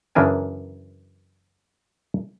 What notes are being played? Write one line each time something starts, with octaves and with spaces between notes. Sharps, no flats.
F#2 C#3 E3 D4 A#4 G#5